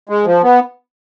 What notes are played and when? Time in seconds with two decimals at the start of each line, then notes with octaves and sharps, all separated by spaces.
0.09 G#3
0.25 F3
0.43 B3